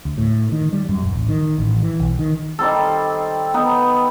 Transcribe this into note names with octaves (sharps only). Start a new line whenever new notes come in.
D2
A2
D#3
G3
F#2
D#1
A1
D#3
A1
E3
B1
D#3
D#3 G3 C4 A4
B3 D#4